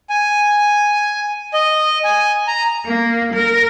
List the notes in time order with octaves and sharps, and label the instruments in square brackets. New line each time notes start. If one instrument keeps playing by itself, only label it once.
[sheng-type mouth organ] G#5
D#5
G#5
A#5
[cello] A#3
A#4